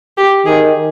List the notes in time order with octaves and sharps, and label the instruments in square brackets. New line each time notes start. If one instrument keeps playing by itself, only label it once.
[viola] G4
[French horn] D#3 [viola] G#4